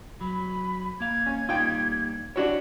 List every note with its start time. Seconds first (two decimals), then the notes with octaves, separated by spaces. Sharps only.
0.21 F#3 B5
1.00 A#3 F5 G#6
1.26 C#4
1.49 G3 A#3 D#4 F4 G5
2.36 D4 E4 F#4 G4 C#5